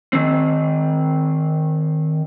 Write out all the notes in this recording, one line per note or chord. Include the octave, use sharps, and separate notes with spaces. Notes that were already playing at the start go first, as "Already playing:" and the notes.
D#3 C4